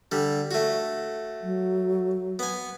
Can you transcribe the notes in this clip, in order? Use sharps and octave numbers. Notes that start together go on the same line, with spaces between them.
D3 G3
A3 F#4
F#3
B3 G#5